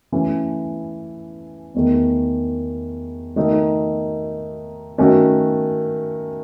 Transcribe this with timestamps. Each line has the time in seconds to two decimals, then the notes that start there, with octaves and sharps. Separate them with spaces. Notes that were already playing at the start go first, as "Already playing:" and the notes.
0.12 E3 A3 C#4
1.74 E2 D#3 A3
3.36 D#3 A3 D#4
4.98 D#3 A3 C#4 F#4